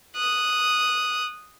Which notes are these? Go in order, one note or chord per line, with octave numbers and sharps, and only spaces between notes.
D#6 F#6